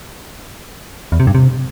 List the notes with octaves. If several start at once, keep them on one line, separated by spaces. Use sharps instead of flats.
E2
C3
G2
C3